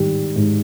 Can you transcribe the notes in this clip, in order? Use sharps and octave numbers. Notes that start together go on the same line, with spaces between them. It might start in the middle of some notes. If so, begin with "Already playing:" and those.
Already playing: G#2 D#3 G3
G#2